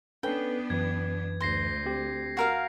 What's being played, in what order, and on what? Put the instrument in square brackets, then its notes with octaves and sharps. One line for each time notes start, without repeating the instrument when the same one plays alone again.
[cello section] B3 D4 [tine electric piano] C#4 A4 B4 [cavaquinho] G5
[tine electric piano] F#2 E3 B4 [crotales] G#6
[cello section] D2 [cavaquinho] C5 [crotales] G6 A#6 C7
[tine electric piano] C4 G4
[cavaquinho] F#4 A#4 F5